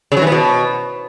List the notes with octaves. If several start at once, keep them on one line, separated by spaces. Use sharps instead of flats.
C#3
F#3
E3
B3
B2